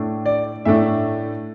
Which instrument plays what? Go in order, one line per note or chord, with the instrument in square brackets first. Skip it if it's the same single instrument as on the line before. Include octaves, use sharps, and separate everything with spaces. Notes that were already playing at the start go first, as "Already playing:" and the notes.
Already playing: [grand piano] A2 A3 D4
D5
A2 A3 D4 E5